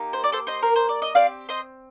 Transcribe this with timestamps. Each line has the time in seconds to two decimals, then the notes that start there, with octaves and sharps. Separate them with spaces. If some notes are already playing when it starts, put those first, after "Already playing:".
Already playing: A#3 D#4 G4
0.13 C5
0.24 D5
0.32 A4 C5
0.47 C5 D#5
0.63 A#4
0.76 C5
0.89 D5
1.02 D#5
1.15 C4 G4 D5 F5
1.49 C5 D#5